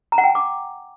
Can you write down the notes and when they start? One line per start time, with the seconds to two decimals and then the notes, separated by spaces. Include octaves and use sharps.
0.12 A#5
0.18 F#5
0.24 G5
0.29 G#5
0.35 D6